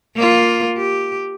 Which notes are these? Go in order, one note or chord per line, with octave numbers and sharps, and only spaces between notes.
A#3 F4
G4